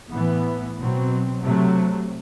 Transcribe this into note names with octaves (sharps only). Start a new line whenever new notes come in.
A2 E3 B3
B2 F#3 C4
C3 F#3 A3